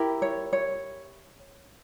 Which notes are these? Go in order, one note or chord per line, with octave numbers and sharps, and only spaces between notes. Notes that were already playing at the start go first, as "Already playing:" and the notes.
Already playing: E4 G4 A#4
C#5
C#5